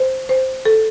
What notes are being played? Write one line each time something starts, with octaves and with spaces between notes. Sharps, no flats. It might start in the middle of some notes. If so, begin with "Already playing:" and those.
Already playing: C5
C5
A4